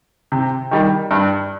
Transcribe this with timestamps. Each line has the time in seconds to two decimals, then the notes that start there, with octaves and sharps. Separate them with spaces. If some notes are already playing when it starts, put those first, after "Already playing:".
0.32 C3
0.71 D#3 G3
1.11 G2